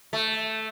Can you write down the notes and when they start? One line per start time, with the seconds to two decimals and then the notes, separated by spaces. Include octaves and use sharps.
0.13 A3